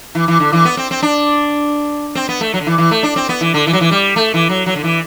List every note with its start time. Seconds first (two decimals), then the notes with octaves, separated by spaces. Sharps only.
0.15 E3
0.28 E3
0.40 D3
0.53 E3
0.65 B3
0.77 C4
0.91 C4
1.03 D4
2.15 C4
2.29 B3
2.41 A3
2.54 F#3
2.61 D3
2.67 E3
2.78 E3
2.91 A3
3.03 D4
3.16 C4
3.29 B3
3.41 E3
3.54 D3
3.67 E3
3.73 F#3
3.81 E3
3.91 G3
4.16 A3
4.34 E3
4.49 F#3
4.66 F#3
4.76 D3
4.84 E3